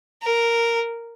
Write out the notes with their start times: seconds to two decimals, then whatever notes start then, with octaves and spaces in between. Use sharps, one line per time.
0.22 A#4